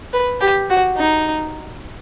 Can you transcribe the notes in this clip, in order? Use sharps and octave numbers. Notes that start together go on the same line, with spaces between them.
B4
G4
F#4
D#4